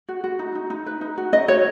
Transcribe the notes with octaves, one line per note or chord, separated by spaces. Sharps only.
F#4
F#4
D#4
D#4
D#4
B4
D#4
F#4
C#4 D#5
F#4 C#5